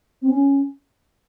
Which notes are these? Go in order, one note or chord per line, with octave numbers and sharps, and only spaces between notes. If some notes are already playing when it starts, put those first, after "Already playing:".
C4
C#4